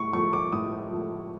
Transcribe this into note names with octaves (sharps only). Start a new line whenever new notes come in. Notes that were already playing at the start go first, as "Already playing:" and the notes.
Already playing: A2 C#6
F3 A3 C#6
D6
A2 D#6
F3 A3